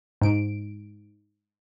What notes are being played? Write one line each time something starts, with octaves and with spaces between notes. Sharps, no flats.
G#2 D7